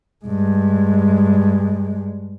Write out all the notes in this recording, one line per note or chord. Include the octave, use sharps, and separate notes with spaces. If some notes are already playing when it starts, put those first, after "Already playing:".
G2 G#3